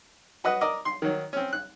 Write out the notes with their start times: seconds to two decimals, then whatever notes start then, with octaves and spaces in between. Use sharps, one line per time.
0.44 F#4 B4 D#5 F#5
0.61 A#4 D5 D#5
0.85 C6
1.02 D#3 F#3
1.33 C4 C#4
1.53 F#6